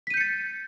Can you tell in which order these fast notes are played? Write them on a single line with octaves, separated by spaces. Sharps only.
B6 D#7 G6 C#7 A6